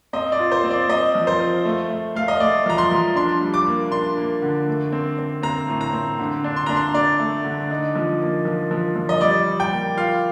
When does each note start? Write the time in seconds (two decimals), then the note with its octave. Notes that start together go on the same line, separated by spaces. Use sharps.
0.13 C4 D#5
0.32 D5
0.39 F4
0.52 C5
0.64 C4
0.71 D5
0.89 C4 D#5
1.15 F3
1.27 C5
1.40 F4
1.65 A3
1.90 A3
2.15 A3 F5
2.28 D#5
2.40 A3 D5
2.66 F3 A#5
2.78 C6
2.91 F3
3.16 D4 C6
3.41 G3
3.54 D6
3.67 A#3
3.92 D4 C6
4.17 A#3
4.42 D3
4.68 A3
4.92 C4
5.19 C4
5.43 C4 A#5
5.68 A2
5.81 A#5
5.93 C4
6.19 D3
6.44 D4
6.56 C6
6.66 D4 A#5
6.76 C6
6.94 D4 D5
7.20 A3
7.44 D3
7.71 D#4
7.95 F3
8.21 A#3
8.45 F3
8.71 F3
8.96 F3
9.09 D#5
9.21 G3 D5
9.46 G3
9.60 G5
9.72 A#3
9.97 F4 F5